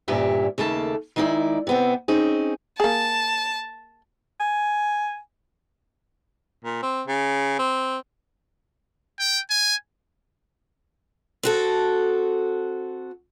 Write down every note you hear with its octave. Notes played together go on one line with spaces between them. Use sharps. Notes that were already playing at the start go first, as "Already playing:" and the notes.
D2 G2 A#2 C#4 G4 E5
D#2 C#3 A3 A#3 A5
D#3 G#3 D#4 E4 D5
C3 B3 C4
C4 C#4 D#4 G#4
A#3 G#4 A5
G#5
A#2
C4
C#3
C4
G5
G#5
C4 F#4 A4